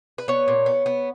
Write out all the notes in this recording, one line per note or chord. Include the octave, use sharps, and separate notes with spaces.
B4
B3 C#5
A#2
B3
B3